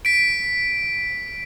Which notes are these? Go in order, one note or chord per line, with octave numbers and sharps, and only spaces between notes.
B6 D7